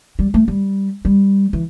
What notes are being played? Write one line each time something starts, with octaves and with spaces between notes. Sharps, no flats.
G3
A3
G3
G3
E3